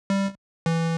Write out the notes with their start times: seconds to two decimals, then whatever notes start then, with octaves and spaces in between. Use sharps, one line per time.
0.10 G3
0.66 E3